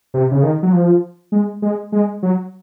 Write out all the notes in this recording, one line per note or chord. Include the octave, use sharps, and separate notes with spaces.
C3
C#3
D#3
F#3
F3
G#3
G#3
G#3
F#3